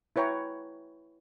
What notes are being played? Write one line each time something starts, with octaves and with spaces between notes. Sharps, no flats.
E4 B4 C#5 G5 A#5